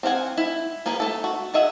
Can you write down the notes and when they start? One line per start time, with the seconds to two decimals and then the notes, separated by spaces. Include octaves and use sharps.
0.03 C4 F5 F#5 G#5
0.37 E4
0.86 A#3 G#4 A#4 B4
1.00 A3 A4
1.24 F#4
1.54 G#4 D#5 E5 F#5